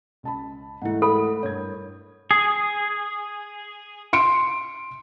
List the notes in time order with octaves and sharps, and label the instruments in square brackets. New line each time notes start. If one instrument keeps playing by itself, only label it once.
[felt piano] C#2 A5 B5
[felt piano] G#2 E3 A3 [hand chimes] E4 F#5
[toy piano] A4 [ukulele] B5
[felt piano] G2 A#4 G#6 [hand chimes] C#5
[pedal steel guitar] G#4
[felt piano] C6 C#7 D7